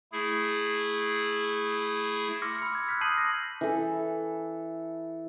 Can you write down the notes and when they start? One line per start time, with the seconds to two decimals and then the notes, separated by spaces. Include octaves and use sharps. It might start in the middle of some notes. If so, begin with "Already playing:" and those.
0.12 A3 E4 G#4
2.42 C6 D6 E6 F6 A#6 C#7
2.58 B5 C#7
2.71 B5 D6 E6 G#6
2.89 F6 F#6 G#6 B6
3.01 A5 D#6 G6 C7 D#7 F#7
3.17 G6 A#6
3.61 E3 A4